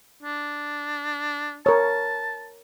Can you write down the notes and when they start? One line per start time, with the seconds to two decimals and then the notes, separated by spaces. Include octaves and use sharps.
0.23 D4
1.66 A#4 C#5 A5